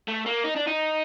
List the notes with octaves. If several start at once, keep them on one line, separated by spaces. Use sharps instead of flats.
A3
A#3
D#4
D4
D#4